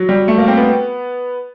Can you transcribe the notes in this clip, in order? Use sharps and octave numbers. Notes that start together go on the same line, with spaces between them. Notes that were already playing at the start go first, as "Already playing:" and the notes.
Already playing: F#3
G3
A3
A#3
C4
B3